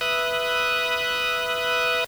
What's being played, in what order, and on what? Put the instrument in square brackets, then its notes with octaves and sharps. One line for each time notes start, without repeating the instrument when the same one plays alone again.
[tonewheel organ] B4 E5 D#6 F#6